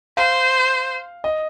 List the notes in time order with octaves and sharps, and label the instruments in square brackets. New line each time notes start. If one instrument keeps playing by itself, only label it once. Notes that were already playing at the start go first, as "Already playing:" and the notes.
[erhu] C5 [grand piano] F5
[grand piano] D#5